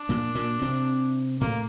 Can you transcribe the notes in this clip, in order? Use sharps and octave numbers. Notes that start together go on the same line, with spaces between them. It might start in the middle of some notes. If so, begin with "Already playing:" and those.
Already playing: D4
A#2 A#3
A#2 A#3
C3 C4
A2 A3 A#3